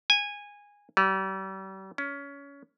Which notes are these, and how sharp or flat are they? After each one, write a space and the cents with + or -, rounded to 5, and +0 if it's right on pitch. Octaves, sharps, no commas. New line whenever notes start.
G#5 -15
G3 -40
C#4 +20